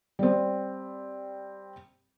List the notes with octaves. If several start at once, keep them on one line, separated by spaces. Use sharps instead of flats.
G3 C4